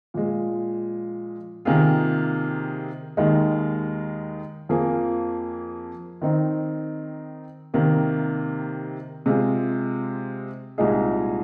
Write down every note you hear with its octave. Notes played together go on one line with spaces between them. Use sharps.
A#2 F3 G#3
C3 D#3 A#3 F4 G#4
D#2 D#3 G#3 D#4
F2 F3 A#3 G#4
D#3 C4 D#4
C3 D#3 A#3
C3 G#3 F4 G#4
C2 A#2 G#3 D#4 G#4